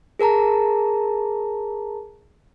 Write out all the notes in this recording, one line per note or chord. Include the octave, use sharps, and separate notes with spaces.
G#4 A#4 A5 A#5